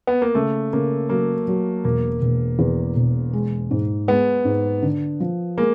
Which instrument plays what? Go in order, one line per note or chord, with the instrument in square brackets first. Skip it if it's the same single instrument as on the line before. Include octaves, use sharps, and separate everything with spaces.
[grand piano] B3
A#3
[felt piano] C#3 [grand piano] A3
[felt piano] C#3 [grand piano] A#3
[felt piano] F#3 [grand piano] A#3
[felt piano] F#3
[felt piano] E1 [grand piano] A#3
[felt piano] E1
E2
E1
G#3
G#2
[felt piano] G#3 [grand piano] B3
[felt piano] G#2
D3
F3
[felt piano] G#3 [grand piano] A#3